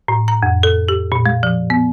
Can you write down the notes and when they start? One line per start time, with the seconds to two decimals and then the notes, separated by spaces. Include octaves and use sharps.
0.08 A2
0.28 A#5
0.43 F2
0.63 A4
0.88 G4
1.12 A#2
1.26 G#3
1.43 F3
1.70 B3